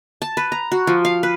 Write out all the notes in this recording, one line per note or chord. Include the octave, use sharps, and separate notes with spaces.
A5
B4
A#5
F#4
F3
F5
B4